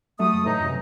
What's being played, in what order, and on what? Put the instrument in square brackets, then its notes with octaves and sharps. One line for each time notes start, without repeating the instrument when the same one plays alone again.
[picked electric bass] F#3 G3 [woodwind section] A3 D#6
[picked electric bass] F#1
[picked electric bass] A2 [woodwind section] E3 F#3 D#4
[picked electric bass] F#2 C3